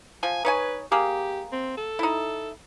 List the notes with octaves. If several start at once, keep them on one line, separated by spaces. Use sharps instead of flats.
F3 G#5
D#4 B4 C#5 G#5
A#3 G4 G#4
C4
A4
D#4 E4